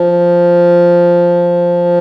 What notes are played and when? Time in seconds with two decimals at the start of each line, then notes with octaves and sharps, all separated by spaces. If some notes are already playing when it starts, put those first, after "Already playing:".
Already playing: F3